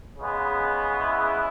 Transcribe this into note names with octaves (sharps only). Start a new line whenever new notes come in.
C#3 G#3 B3
E4